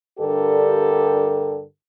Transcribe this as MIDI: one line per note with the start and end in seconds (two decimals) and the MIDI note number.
0.19 1.62 43
0.19 1.62 50
0.19 1.62 67
0.19 1.62 69
0.19 1.62 70